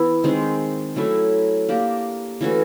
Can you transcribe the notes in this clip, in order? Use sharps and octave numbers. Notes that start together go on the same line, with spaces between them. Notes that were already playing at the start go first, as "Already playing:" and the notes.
Already playing: E3 B3 E4
D#3 G#3 C4
F#3 A3 C#4 E4
A#3 D4 G4 A#4
E3 A3 C#4 F#4